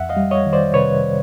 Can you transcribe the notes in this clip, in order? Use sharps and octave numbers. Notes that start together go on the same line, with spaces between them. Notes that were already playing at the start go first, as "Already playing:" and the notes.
Already playing: F2 E5 F#5
D#5 F5
G3
C#5 D#5
D#3
C5 D5
C3 B4 C#5